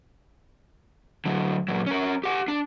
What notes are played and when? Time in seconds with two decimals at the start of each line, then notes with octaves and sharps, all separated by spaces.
1.26 D3 F#3
1.68 A#2 F#3
1.86 C#4 A#4
2.24 G4 F#5
2.48 D4